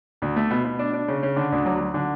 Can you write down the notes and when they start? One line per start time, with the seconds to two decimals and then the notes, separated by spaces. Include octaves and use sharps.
0.22 D2
0.36 A3
0.51 B2
0.64 B2
0.79 D4
0.93 D4
1.08 C#3
1.23 C#3
1.36 D3
1.52 D2
1.65 F#3
1.80 F#3
1.94 D3